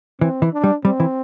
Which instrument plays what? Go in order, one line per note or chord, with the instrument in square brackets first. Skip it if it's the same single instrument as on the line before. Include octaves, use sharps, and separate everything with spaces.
[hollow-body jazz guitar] E3 [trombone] C4
[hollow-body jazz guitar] E3
[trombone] D4
[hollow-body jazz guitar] G3
[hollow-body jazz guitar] G3 [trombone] C4
[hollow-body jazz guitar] E3